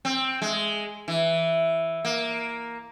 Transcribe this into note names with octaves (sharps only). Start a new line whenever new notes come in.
C4
G#3
E3
A#3